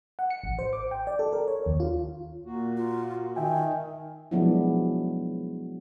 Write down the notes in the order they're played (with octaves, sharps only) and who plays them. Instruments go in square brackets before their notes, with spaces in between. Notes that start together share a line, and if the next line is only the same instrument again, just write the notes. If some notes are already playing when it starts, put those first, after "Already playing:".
[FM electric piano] F#5
C#7
A1
C5
D6
G5
D5
A4
A#4
C#5
D#2
F4
[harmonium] A#2 A#3 F#4
[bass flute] F4
[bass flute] D#3 [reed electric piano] E5 G5 G#5
[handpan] F3 F#3 G#3 B3 D4 E4